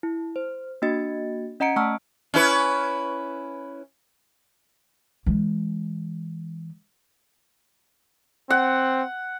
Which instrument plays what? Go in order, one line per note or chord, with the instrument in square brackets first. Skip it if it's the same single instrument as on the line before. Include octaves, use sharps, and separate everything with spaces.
[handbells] E4
C5
A#3 D4 F#4 D#5 A6 C#7
C#4 D#5 F#5 A#5 C#7 D7
A3 F#5 A5 C#6 E6 F6
[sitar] C#4 E4 B4
[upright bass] E3 G#3
[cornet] C4 [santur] F#5